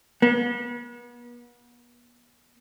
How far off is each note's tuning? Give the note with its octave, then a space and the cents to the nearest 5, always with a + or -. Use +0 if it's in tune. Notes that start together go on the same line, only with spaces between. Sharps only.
B3 -40